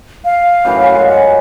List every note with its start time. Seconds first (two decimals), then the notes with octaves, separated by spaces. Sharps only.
0.25 F5
0.65 F#2 A2 E3
0.95 F#2 G#3
1.09 F#5